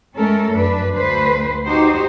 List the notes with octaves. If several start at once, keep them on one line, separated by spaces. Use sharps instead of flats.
G#3 A3 C#4 A4 A#4
F#2 D4 B4
D2 A3 B4 C5
D#4 F#4 G4 C5